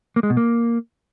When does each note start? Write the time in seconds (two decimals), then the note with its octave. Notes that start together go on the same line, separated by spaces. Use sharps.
0.16 A#3
0.23 G#3
0.30 B2
0.37 A#3